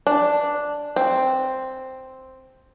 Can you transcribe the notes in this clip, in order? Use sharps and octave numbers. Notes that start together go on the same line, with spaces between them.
D4
C4